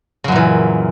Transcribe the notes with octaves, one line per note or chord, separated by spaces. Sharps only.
F#2 A#2 C#3 E3